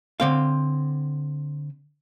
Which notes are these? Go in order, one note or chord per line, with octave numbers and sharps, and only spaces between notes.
D3 C4 F5